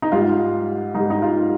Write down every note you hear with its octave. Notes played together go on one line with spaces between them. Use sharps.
D#4
G#2 G3 F4
G#2 G3 D#4
D#4
F4